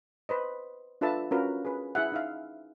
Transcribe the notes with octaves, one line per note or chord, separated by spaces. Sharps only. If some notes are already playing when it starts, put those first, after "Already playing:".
B4 C5 D#5
D4 F4 A4 B4 E5 A5
C#4 F4 F#4 A#4 B4
G#4 B4
E4 G#4 E5 F#5
D#4 E5 F5